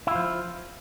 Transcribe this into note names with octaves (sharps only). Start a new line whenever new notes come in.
F3 E4 F4